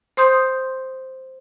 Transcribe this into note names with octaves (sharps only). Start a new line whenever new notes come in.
C5 C6 D#6 G6